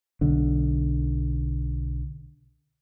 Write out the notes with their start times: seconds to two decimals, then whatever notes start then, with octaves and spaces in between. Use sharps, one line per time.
0.21 B1 D3